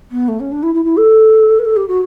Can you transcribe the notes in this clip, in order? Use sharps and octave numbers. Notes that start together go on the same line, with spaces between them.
B3
A3
C#4
D4
E4
E4
E4
A4
B4
A4
G4
F#4